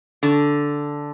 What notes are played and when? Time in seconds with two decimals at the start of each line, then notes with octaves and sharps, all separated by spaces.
0.23 D3